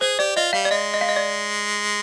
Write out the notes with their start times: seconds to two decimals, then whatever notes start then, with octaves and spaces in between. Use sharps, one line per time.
0.01 G#4 C5
0.19 G4 D5
0.36 F4 D#5
0.53 G3 F5
0.65 D5
0.71 G#3 D#5
0.94 D#5
1.01 F5
1.09 D#5
1.16 D5